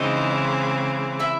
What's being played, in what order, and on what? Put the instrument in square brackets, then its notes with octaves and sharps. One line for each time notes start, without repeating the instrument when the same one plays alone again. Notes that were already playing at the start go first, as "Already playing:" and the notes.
Already playing: [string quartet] C#3 E3 G#3 C4 [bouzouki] D#4 D#5
[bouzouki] E4 E5